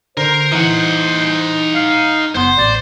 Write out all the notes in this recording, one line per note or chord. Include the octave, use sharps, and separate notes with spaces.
D3 A#4 C5
E3 D#4 F#5
F5
F#1 B3 C5 C6
A1 D5